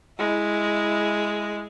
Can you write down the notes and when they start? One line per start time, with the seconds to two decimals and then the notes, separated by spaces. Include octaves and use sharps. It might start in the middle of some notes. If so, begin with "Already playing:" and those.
0.19 G#3 E4